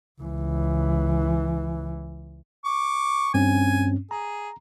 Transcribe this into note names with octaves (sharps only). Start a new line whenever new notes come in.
C#2 E3
C#6 D6
G2 C4 C#4 G#5
G#4 A#5